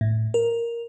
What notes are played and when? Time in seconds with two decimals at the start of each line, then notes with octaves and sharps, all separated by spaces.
0.01 A2
0.34 A#4